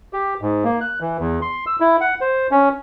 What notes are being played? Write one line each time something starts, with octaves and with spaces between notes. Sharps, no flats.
G4
G#2
A#3
F#6
E3
E2
C6
E6
E4
F#5
C5
C#4